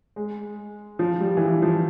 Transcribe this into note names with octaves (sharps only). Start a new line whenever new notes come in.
G#3
F3
G3
E3
F3
F3